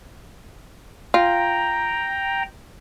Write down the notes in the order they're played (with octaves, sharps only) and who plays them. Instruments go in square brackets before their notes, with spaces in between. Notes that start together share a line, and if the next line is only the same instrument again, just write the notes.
[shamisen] F4 [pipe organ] G5 A#5